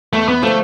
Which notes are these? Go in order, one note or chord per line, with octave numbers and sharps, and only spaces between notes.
E2 A3
B3
D3 F3 A3